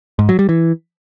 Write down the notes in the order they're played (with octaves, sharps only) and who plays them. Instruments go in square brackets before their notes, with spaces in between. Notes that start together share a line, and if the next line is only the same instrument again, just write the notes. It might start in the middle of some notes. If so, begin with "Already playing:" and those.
[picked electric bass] G#2
F#3
G3
E3